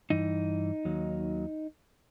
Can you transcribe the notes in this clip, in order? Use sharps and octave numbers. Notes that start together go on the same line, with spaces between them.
G2 E3 D#4
D#2 D#3 F#3